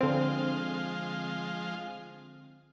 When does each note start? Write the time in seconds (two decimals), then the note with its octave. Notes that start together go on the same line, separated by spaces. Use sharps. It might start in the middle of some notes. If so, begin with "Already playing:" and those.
0.01 D3 F3 G#3 C4 F4